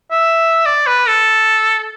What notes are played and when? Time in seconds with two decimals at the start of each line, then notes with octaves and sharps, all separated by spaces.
0.11 E5
0.65 D5
0.86 B4
1.07 A4